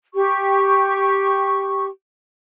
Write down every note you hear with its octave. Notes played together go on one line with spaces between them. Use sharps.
G4 C#6